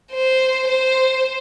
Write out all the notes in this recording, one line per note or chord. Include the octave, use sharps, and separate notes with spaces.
C5
C5